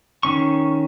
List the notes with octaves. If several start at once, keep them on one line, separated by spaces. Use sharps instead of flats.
D#3 C#4 C#6